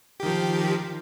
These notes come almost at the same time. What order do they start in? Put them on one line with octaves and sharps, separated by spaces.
G4 D#3 F3